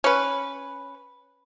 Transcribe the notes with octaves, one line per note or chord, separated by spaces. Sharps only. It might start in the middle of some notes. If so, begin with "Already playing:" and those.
C#4 B4